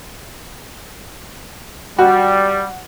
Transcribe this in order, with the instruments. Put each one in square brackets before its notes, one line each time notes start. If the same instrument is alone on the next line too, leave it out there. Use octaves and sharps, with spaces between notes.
[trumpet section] G3 [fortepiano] F#4